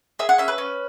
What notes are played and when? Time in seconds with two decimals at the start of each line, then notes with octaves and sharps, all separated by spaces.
0.19 G#4 E5
0.29 F#5
0.38 C#4 E5
0.48 B4
0.58 C#4